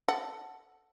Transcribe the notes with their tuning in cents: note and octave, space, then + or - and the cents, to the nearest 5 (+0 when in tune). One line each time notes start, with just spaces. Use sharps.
A4 +0 F#5 +0